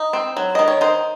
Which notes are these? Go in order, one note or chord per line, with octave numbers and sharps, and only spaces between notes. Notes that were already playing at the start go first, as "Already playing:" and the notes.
Already playing: D#4
C4
F#3
D#3 D#5
C#5
D#4 C5